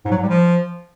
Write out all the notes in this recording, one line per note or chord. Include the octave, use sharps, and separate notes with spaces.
G#2
F#3
G#2
G3
F3